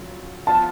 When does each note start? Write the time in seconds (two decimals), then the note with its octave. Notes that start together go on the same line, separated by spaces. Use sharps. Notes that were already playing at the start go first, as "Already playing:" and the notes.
Already playing: C#3 F#3 F4
0.47 F3 B3 F4 A5